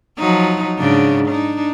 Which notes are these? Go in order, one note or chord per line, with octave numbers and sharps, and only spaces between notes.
F3 F#3 D#4
G#2 C#3 D4
D4 D#4